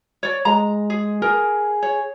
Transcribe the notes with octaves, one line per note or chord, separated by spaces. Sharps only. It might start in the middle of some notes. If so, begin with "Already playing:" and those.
C#5 D5
G#3 A#5
G#4
G#4 A#4
C#5